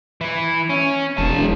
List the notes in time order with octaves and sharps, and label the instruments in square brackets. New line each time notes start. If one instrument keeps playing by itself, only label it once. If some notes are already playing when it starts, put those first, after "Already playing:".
[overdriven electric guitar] E3 E4
C#4
[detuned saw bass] E1 [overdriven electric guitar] F#3 A5